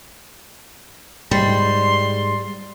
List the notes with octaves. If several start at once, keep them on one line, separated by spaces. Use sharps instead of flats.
G#2 G3 C6